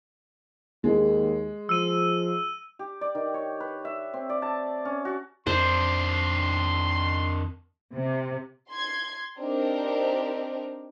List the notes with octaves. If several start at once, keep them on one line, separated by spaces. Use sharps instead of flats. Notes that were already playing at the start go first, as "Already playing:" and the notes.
D#2 G#3
F3 E6 D#7
G4
D5
D#3
C#5
B4
E5
C4
D5
A5
C#4
F#4
F2 D#3 D4 C5 C6
C3
C6 G#6
C4 D4 D#4 G4 A#4